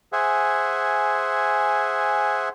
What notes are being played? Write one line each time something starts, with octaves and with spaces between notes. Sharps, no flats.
G#4 C5 E5 F#5 G#5